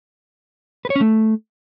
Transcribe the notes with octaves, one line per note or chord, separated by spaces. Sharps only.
B4
C#5
C#4
A3